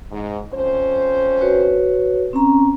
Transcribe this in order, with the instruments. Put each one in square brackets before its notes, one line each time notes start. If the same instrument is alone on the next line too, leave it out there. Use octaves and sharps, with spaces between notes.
[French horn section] G#2
F2 C#4 C5
[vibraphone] F#4 B4 C#5
C4 C#4 A#5